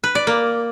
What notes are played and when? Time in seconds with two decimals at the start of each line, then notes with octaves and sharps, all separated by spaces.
0.04 B4
0.15 D5
0.27 A#3